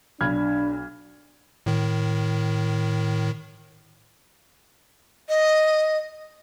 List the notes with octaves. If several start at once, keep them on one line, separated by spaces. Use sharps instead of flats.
B1 D4 B5 F6 G#6
A2 D#3
D#5